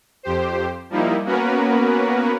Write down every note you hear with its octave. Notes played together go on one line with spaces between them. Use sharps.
F2 G4 C5
F3 G3 A#3 D#4 E4
A#3 B3 C#4 F#4 A#4 B4